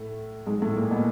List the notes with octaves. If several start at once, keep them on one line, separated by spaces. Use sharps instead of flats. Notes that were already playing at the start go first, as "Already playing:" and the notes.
Already playing: A2 A3
G#2 G#3
A2 A3
A#2 A#3
B2 B3